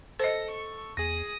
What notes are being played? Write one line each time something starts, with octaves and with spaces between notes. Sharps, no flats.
A4 C5 D#5 A#6 C#7
C#6
E2 G#4 D#6 A#6